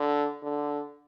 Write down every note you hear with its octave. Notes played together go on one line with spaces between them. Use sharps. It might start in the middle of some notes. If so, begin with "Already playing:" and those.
Already playing: D3
D3